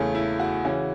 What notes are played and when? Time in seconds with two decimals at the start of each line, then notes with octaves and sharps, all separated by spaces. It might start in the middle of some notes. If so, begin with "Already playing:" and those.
Already playing: E2 C#3 A3 C#4
0.15 E4
0.40 F#4
0.65 C#3 E3 C#4 F#4